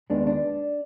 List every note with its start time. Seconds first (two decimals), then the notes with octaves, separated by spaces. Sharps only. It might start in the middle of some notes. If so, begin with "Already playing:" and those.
0.10 D#2 D#3 G#3 B3 D4
0.27 D4